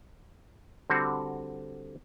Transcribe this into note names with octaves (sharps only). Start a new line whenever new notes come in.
D3 G3 C4 F#4